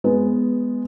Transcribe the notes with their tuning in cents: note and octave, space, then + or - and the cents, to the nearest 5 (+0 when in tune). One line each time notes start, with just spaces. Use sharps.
G#3 +0 B3 +0